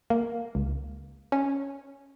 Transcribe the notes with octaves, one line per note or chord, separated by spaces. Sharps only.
A#3
C#2
C#4